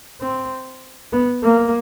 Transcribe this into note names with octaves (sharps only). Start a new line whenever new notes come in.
C4
B3
A#3